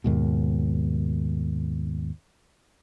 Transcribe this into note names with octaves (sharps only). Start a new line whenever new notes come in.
D#2 G#2 B2